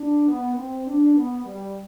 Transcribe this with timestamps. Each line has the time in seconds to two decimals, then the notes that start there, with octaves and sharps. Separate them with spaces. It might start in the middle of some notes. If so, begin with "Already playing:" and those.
Already playing: D4
0.28 B3
0.57 C4
0.86 D4
1.15 B3
1.45 G3